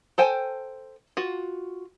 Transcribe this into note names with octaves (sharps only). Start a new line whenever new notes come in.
A4 C5 G5 G#5
F4 F#4